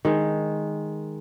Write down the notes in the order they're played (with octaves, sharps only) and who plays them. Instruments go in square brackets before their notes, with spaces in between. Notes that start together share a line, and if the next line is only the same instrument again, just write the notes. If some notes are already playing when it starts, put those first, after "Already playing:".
[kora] D#3 G#3